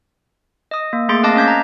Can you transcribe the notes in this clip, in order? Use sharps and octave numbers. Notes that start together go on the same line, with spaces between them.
D#5 D#6
A#3
A3 A#3 G#4 C6 A6 D7
C4 D#5 F5 A5 D6 A#6
C#4 D#5 A5 G6 G#6 B6
A#5